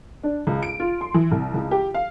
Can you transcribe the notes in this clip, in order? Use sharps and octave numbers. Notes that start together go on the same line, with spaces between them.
D4
C#2
D7
F4
C6
E3
C2
C#2
G4
F5